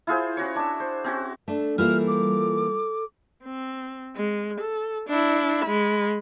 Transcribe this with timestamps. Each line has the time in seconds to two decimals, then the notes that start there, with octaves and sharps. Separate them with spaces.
0.07 E4 F4 G#4 C5
0.37 C#4 F#4 C#5
0.56 D4 E5
0.80 C5
1.04 C4 C#4 F#4
1.48 A3 D4 A4
1.78 E3 G3 A#3 F4 E5 F6
2.08 D6
3.44 C4
4.16 G#3
4.61 A4
5.09 D4 E4
5.65 G#3 B5